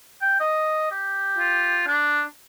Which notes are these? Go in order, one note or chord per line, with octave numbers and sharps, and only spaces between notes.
G5
D#5
G4
F4
D4